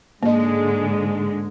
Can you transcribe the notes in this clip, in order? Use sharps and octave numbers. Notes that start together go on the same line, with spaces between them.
G#2 D3 G#3 A#3 D#5